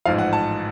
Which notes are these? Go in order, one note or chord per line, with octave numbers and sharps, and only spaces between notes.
A1 G#2 F3 F5
F#5
A5